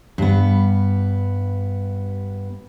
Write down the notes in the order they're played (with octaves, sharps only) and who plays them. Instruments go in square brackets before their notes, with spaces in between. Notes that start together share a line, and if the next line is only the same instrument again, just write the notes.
[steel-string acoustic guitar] G2 B3